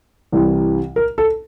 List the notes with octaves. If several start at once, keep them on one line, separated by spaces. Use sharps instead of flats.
C2 C3 E3 G3
A#4
A4